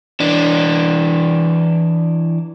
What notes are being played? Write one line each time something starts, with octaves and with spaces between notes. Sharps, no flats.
E3 D4